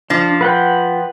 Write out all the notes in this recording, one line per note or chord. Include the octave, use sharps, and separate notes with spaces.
F3 D4
B4 F#5 G5